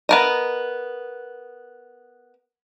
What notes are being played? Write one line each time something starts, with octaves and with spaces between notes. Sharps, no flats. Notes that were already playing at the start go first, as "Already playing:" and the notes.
B3 A#4 D#5